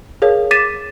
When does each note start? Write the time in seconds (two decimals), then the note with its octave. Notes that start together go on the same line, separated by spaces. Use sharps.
0.22 G#4 A#4 C#5 F5
0.51 D6 A6 B6 D#7 E7